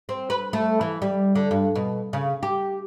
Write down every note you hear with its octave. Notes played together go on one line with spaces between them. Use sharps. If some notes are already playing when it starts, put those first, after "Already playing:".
C4
B4
A3
E3
G3
D3
G2
B2
C#3
G4